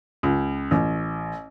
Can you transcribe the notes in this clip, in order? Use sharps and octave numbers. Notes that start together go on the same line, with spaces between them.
C#2
A1